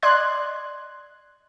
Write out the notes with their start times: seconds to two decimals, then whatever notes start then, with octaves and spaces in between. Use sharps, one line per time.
0.03 D5 D#5 C6 F#6 G#6